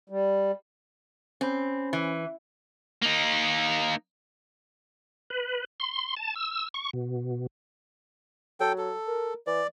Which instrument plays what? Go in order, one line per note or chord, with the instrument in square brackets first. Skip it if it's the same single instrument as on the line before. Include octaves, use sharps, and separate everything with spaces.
[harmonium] G3
[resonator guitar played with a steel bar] C4 [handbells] C#4 C5 B5
[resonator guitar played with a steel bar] E3
[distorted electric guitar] A#3 D#4
[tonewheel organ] B4
C6
A5
E6
C#6
B2
[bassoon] F#3 [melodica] A4 G5
[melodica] A4
[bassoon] A#4
[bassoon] E3 [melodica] D5